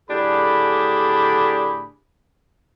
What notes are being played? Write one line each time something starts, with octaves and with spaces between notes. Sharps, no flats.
A2 D3 D4 G4 G#4 B5